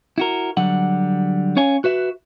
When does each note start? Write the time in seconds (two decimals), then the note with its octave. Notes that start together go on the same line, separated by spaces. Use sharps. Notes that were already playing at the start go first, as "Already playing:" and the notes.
0.18 E4 F#4 A#4
0.57 D3 F#3 G3 F#5
1.57 C#4 C#5 F5 G#5
1.84 F#4 B4 E5